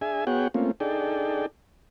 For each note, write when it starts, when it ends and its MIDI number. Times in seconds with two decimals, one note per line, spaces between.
0.01 0.25 62
0.01 0.25 68
0.01 0.25 76
0.01 0.25 80
0.27 0.48 59
0.27 0.48 66
0.27 0.48 68
0.27 0.48 73
0.27 0.48 78
0.27 0.48 79
0.54 0.71 57
0.54 0.71 58
0.54 0.71 60
0.54 0.71 61
0.54 0.71 65
0.80 1.46 62
0.80 1.46 63
0.80 1.46 68
0.80 1.46 69
0.80 1.46 74
0.80 1.46 79